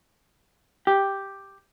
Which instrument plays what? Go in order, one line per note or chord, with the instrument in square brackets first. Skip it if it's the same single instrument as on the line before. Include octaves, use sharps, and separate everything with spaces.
[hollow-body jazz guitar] G4